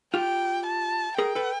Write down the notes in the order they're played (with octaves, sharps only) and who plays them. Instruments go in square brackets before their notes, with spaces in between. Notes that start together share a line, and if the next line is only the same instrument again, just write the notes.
[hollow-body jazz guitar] F4 G4 [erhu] G5
[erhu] A5
[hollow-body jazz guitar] G#4 A#4 [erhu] G5
[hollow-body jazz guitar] A4 B4